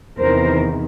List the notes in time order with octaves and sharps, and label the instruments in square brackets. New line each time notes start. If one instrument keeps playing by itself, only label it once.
[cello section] E2 C3 D#3 A#4 C5